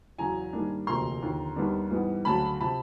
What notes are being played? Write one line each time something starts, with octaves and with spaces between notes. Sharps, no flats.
E2 C#3 F#3 G#5 A#5
G#2 D#3 G3 A#3 D4
E1 D2 C3 F3 A#3 A#5 C6
D#2 D3 F3
D#2 D#3 G3 B3 D4
G#2 E3 G3 B3
D2 C#3 F#3 A5 B5
C3 F3 A5 B5